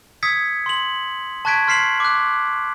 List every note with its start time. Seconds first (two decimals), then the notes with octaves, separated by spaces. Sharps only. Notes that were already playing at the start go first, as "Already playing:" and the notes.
0.23 D#6 E6 G#6 B6 C#7
0.66 C6 F#7
1.45 A5 C#6 F#6 G#6 B6 D7
1.67 C6 F6 B6 C7 E7 F#7
2.00 D6 F#6